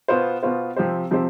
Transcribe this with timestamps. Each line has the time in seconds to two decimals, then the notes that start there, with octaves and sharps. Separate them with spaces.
0.08 B2 B3 F4 C5
0.43 B2 B3 F4 C5
0.76 C3 F3 C4 G4 C5
1.11 C3 F3 C4 G4 C5